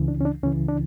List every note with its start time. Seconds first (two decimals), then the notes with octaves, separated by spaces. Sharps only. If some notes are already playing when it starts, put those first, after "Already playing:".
Already playing: C#2 C#3 E3
0.08 D4
0.21 C#4
0.25 D4
0.43 C#2 C#3 E3 C#4
0.69 D4